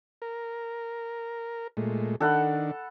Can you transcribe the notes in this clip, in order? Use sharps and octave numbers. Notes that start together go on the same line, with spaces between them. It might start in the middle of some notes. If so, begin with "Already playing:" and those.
A#4
A#2 G#3 A3
D#3 D4 A4 F#5 B5